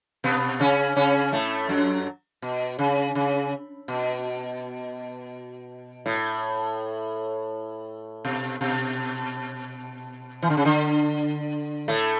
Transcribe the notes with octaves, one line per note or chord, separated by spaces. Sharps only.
B2 B3
C#3 C#4
C#3 C#4
A2 A3
F#2 F#3
B2
C#3
C#3
B2
A2
B2
B2
E3
D3
C#3
D3
A2 A3